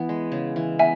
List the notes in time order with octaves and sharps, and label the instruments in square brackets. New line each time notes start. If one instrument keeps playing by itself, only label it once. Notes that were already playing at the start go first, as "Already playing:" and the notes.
Already playing: [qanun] E3 B3
G#3
C#3
E3
[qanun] B3 [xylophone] E5 G#5